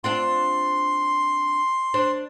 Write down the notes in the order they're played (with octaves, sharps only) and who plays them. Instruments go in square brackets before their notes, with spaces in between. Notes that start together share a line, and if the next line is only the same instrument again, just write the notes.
[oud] C4 D4 F4 [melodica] C6
[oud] D4 C5